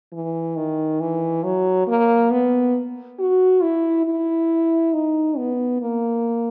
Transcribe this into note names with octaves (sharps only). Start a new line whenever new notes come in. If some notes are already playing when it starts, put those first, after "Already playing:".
E3
D#3
E3
F#3
A#3
B3
F#4
E4
E4
D#4
B3
A#3